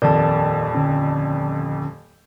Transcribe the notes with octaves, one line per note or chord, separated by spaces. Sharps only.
D#1 F2 D#3 A#4 D5 A5
D3 C#4